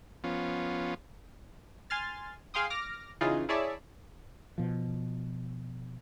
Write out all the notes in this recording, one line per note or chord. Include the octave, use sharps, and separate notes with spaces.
F3 B3 C#4 F4
G#5 C6 F6 A6
G#4 F5 G5 C6 D#6
D6 F6 A#6
C#3 E3 D#4 F4 G#4
E4 G#4 C#5 D5 E5 A5
B2 F3